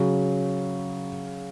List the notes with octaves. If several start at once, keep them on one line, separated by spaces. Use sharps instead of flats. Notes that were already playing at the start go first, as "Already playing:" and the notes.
Already playing: C#3 F#3